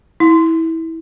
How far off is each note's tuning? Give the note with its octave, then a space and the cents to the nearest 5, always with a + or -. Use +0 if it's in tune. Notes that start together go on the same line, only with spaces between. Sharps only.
E4 -20